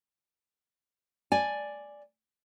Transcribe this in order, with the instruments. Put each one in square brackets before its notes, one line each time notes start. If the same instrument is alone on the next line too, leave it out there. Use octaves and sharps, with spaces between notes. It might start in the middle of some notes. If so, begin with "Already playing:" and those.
[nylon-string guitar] D5 G#5